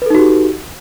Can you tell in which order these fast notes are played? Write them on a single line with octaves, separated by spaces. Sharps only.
B4 A4 D#4 F#4 G4